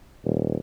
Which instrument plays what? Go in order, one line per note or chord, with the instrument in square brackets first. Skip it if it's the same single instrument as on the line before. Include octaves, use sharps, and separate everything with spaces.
[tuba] D#1